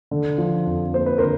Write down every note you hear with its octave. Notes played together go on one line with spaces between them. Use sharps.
D3
F3
F2
A#3 C5
B4
D3 A#4 C5